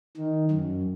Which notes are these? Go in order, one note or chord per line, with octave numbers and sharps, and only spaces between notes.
D#3
F#2